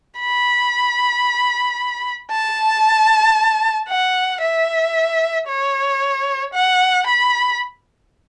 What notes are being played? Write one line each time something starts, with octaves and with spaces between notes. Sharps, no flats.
B5
A5
F#5
E5
C#5
F#5
B5